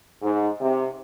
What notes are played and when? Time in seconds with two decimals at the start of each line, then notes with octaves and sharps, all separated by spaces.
0.22 G#2
0.60 C3